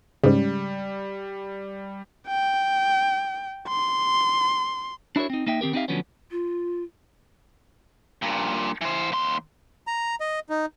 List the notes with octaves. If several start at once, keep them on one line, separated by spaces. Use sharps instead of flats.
G#2 C#3 G3
G5
C6
D4 E4 F#4 A#4 C#5
C4 D#4
A#3 D#4 E5 G5
D#3 C4 G4 A#4
B3 C4 D#4 G4 E5 F5
D2 D3 F3 F#3 B3 C#4
F4
G2 A#2
E3 C5
D#2 C6
A#5
D#5
D#4